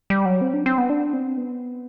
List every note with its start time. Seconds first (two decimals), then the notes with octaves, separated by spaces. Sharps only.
0.10 G3
0.26 F#3
0.41 C4
0.54 D4
0.66 C4
0.78 B3
0.90 D4
1.13 C4
1.37 B3